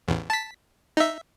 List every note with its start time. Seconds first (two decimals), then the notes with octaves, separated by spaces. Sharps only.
0.08 A1 E2
0.30 A5 B6
0.97 D#4 E5